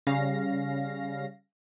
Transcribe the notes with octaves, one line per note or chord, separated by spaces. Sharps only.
C#3 G3 C#4 F5 A#6